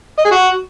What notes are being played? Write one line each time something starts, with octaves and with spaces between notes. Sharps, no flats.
D#5
G#4
F#4